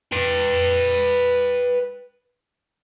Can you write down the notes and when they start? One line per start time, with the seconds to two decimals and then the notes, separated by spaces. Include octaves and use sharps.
0.12 B4 G5